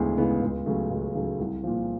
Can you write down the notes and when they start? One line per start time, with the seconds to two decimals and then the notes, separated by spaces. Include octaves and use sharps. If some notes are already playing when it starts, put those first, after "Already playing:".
Already playing: D2 C#3 E3 G#3 B3
0.18 C#3 E3 G#3 B3
0.42 C#2
0.66 C#3 F#3 A3
0.90 C#2
1.15 C#3 F#3 A3
1.39 C2
1.63 A#2 F3